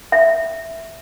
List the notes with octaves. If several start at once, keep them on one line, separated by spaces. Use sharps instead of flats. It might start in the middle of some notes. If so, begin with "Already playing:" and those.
E5